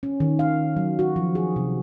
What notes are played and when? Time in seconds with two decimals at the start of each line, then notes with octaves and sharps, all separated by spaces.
0.03 C#4
0.20 D#3
0.39 F5
0.76 F#3
0.99 F#4
1.16 F3
1.35 G#4
1.56 C3